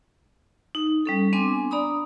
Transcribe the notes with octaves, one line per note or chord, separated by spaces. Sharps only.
D#4
G3 C#4 A4
B3 C4 D4 G#5 C6 D6
D4 D5 A#5 B5 D#6